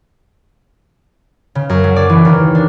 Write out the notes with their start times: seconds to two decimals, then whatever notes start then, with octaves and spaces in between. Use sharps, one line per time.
1.55 C#3
1.69 F#2
1.84 F#3
1.96 D5
2.09 E3
2.25 D#2
2.55 D4